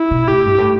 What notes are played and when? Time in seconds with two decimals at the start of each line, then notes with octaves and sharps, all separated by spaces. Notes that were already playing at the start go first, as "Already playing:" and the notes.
Already playing: E4
0.11 B2
0.28 A2 G4
0.45 G2
0.58 A2